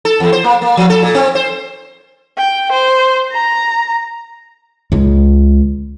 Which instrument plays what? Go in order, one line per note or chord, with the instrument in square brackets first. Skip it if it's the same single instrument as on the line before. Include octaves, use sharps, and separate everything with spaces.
[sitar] A4
E2
C5
A#3
A#3
F3
A4
A#2
C4
C5
[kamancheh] G5
C5
A#5
[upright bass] C#2 G#3